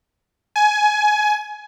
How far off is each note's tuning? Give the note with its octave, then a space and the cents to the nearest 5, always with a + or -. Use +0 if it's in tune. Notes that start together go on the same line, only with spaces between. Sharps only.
G#5 +20